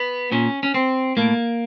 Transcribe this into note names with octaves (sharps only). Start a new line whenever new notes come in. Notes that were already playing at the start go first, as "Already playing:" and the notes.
Already playing: B3
A#2 C#4
C#4
C4
A2 A#3